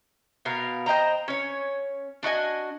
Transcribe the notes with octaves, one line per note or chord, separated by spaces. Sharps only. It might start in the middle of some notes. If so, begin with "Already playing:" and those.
B2 B3 A#4 F5
C5 D#5 G5 A#5
C#4 C#5
D4 F#4 D#5 G#5